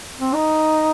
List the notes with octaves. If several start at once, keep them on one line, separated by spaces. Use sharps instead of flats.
C4
D#4